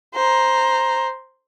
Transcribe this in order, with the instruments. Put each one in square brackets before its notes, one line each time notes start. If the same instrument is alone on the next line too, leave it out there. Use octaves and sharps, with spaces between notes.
[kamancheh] C5 A#5